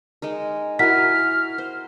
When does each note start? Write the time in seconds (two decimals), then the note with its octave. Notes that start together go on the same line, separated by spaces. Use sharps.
0.22 G#3 D#4 A#4
0.79 E4 F#4 A#4 G#5 F6 B6
1.58 C5